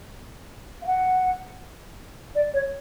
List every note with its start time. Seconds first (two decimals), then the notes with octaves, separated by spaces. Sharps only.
0.81 F5
0.86 F#5
2.35 D5
2.53 C#5